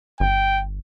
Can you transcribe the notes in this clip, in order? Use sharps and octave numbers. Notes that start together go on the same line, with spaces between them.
G1 G5